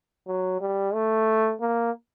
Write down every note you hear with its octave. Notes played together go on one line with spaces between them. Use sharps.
F#3
G3
A3
A#3